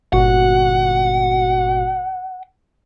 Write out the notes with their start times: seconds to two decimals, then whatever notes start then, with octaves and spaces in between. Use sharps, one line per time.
0.13 G1 A#2 F#4 F#5